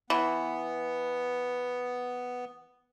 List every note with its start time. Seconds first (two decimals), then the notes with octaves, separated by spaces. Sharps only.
0.10 E3 B3